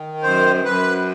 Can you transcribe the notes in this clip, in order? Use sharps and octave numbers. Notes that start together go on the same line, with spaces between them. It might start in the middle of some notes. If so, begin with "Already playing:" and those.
Already playing: D#3
F#2 C5
F#2 B4